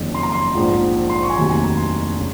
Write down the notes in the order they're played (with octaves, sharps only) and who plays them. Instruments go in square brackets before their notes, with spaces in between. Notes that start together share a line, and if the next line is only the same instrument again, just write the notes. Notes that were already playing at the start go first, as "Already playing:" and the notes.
Already playing: [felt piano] F#1 F2 D#3
C6
A#5
C6
A#1 G#2 F3
C6
C#6
G#5
F1 D#2 D#3 F#3 A#5
G#5
A#5
C6
C#3